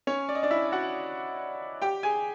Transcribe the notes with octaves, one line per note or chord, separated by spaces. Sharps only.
C#4 C#5
D5
D#5
D4 D5
E4 E5
F#4 F#5
G4 G5
G#4 G#5